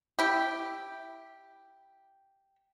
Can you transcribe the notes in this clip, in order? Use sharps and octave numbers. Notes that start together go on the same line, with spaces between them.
E4 G4